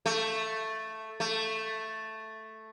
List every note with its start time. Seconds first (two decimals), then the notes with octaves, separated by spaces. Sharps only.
0.06 A3
1.20 A3